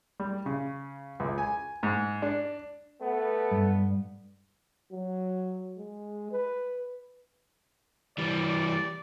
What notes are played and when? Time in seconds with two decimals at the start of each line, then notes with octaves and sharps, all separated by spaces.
0.20 G3
0.46 C#3
1.20 C#2
1.38 G#5
1.83 G#2
2.22 D4
3.02 A3 B3
3.51 G2
4.92 F#3
5.78 G#3
6.32 B4
8.18 E3 G3 D5